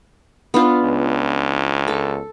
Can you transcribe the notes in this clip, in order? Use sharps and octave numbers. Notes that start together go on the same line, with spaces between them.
B3 D4 F4
C#2
A4